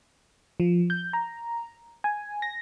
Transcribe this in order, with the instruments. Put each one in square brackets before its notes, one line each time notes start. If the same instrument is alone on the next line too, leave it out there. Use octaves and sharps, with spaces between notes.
[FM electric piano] F3
G6
A#5
G#5
A#6